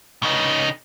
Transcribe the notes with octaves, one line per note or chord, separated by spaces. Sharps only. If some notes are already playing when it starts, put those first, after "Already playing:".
C#3 D#4